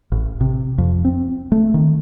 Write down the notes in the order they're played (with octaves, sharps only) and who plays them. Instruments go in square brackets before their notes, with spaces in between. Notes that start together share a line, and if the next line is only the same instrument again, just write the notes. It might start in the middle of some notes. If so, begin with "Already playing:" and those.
[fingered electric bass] A1
C3
F2
C4
A3
D#3